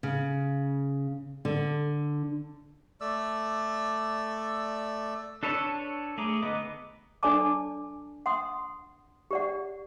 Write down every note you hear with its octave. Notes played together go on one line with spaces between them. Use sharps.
C#3
D3
A3 D5 E6
D4 A4 B4 C#5
A3 G#4 A#5 D6
D3 B3 B4 D#5 D6
D4 A4 D5 G#5 A5 D6
F#5 C6 D#6
G4 D5 F#5